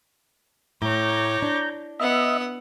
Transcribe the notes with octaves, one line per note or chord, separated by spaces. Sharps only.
A2 C#5 A#5 D6 G6
D4
B3 D#5 E5 F#5